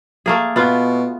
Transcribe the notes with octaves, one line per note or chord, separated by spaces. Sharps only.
A3 A#3 G#4
B2 B3 F4